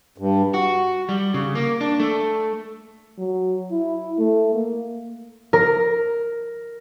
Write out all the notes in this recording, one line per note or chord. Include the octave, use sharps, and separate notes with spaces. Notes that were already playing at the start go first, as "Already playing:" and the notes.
G2
F#4
G3
C#3
A#3
D4
A3
F#3
E4
A3
A#3
A#4